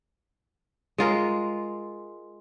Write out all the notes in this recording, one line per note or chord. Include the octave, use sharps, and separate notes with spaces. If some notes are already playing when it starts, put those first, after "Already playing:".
G#3 F4 A#4